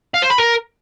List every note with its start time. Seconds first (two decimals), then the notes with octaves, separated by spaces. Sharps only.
0.14 F5
0.22 C5
0.30 B5
0.38 A#4